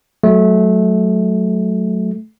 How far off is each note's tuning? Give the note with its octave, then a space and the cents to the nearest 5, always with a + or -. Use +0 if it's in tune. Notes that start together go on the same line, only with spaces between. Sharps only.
F#3 +0 A3 -20